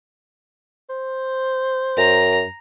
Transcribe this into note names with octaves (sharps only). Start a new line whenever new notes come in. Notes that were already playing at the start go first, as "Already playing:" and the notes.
C5
F#2 A#5